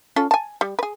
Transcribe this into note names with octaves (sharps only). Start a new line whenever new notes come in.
C#4 F4 A4
G#5 A5
G3
G#4 B4